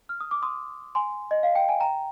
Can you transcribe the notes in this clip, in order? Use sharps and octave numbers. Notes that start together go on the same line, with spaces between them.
F6
D#6
D6
C6 D#6
G#5 C6
D#5
F5
G5
G#5
G5 A#5